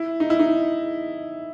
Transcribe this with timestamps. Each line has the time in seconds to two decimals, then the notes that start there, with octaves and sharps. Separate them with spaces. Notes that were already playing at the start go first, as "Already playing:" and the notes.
Already playing: E4
0.20 D#4
0.30 E4
0.39 D#4